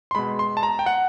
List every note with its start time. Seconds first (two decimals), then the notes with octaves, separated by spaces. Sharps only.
0.11 C6
0.15 B2 G#3 B5
0.39 C6
0.57 A5
0.63 A#5
0.79 G5
0.86 F#5